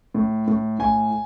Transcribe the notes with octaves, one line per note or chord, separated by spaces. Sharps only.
A2
A2
A2 G#5